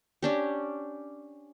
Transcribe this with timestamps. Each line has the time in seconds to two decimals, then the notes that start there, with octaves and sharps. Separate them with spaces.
0.22 C#4 D4 G4